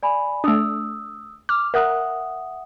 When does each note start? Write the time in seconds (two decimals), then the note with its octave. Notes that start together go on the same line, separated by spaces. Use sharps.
0.03 D5 G#5 B5
0.44 A3 D4 D#6 E6
1.49 D6 F6
1.74 A#4 E5 F#5 D#6 F#6